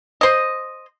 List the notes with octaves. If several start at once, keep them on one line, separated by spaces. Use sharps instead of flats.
C5 D#5